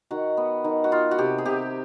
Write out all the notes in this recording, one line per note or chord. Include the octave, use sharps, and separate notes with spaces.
D#3 F#4
B3
D#3
F#4
B3 F4
F#4
C3 G4
G#4
C3 G4